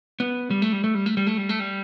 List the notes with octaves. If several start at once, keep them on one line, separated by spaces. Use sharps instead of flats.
B3
G3
A3
G3
A3
G3
A3
G3
A3
G3
A3
G3